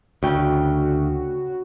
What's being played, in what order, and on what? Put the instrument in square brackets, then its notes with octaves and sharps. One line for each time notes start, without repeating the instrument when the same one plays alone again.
[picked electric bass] D2 [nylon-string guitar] C#3 G5 [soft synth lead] F#4